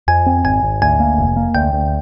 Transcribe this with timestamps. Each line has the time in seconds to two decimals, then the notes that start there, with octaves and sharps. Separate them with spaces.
0.08 F2 G#5
0.26 C4
0.45 G#1 G#5
0.63 G#1
0.82 D2 G#5
1.00 A#3
1.18 F1
1.37 A#3
1.55 D2 G5
1.73 D2